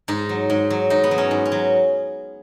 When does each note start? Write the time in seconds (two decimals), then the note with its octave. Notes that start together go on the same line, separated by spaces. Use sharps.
0.08 G#2 D#4
0.29 F#3
0.50 G#2
0.70 F#3
0.90 G#2 D#4
1.04 B3
1.11 F#3
1.18 C#4
1.31 G#2
1.45 C#4
1.52 F#3